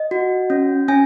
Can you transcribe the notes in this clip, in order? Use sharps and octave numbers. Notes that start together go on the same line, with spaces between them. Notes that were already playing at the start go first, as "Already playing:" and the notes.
Already playing: D#5
F#4
C#4
C#4 G#5